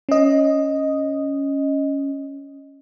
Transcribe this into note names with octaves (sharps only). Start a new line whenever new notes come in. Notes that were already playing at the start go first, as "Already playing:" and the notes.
C#4 D#5